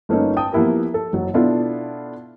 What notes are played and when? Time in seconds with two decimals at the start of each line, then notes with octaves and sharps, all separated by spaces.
0.09 G1 A3 A#3 C#4 D#4
0.37 G5 A5 D#6
0.52 F3 A#3 B3 E4 G4 A#4
0.94 A4
1.13 F#1 F#3
1.34 B2 B3 D4 E4 F4 A4